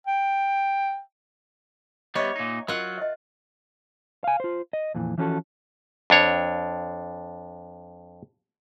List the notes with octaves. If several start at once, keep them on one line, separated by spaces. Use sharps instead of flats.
G5
G3 B3 C#5 D#5 E5
A#2 D#4
F#3 F4 A#4 D#5 F#5
D#5 E5
F5 G#5
F4 C5
D#5
F2 A#2 E3
E3 F3 C#4 F#4 G4 A4
F2 D4 C#5